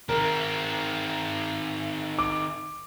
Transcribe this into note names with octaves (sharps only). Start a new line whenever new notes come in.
D#3 C4 A#4
D6